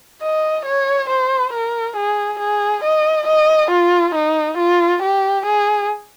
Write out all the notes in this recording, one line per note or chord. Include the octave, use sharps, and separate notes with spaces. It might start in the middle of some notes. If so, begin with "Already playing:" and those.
D#5
C#5
C5
A#4
G#4
G#4
D#5
D#5
F4
D#4
F4
G4
G#4